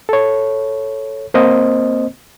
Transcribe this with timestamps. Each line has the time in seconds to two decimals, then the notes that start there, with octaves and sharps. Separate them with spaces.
0.09 A4 C#5
1.34 A#3 C4 C5 D#5